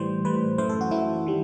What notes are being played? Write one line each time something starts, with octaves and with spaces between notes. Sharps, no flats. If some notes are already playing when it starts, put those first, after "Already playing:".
Already playing: A2 E3 G3 C5
A2 E3 G3 B4
F#2 E3 A3 C5
A4
F#4
F#2 E3 A3 E4
D#3 G3